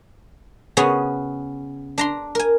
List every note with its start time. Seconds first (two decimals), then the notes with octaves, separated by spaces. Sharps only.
0.77 C#3 B3 C#4 F#4 G#4
1.98 D4 A#5 C6
2.35 A#4 G#5